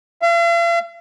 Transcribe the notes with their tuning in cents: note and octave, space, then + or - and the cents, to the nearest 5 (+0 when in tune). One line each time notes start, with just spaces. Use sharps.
F5 -45